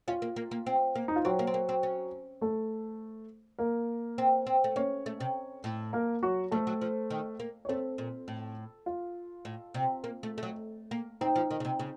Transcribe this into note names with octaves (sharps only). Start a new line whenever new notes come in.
C#4 F4
A#3
A#3
A#3
C4
A#3
D#4
F4
F#3 C4 F#4
A#3
C4
A#3
C4
C#4
A3 A4
A#3 A#4
C4
C4
A3
A#3 C#4 C#5
A3
C3
A2
A#3 A#4
F#3 F#4
F3 A3 A4
F#3
F3
D#3
A#3
C#5
A3 C4 C5
A#2
A2
F4
A2
C3
A#3
A3
A3
F#3
A#3
C4 D#4
F3
D#3
C#3
C3
C#3